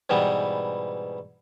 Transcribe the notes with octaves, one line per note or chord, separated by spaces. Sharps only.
G#2 B2 E3 G3 B3